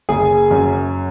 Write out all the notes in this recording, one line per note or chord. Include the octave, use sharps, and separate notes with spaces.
F#1 G#4 G#5
F#2